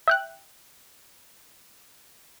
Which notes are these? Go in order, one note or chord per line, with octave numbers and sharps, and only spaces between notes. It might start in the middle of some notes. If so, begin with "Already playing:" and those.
E5 G5 F#6